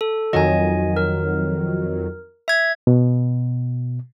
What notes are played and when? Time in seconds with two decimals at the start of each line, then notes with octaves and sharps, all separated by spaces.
0.01 A4
0.33 F2 D#3 F#3 D#5 G#5
0.96 A#4
2.48 E5 G#6
2.87 B2